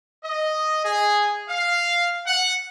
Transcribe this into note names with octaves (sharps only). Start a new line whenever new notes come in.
D#5
G#4
F5
F#5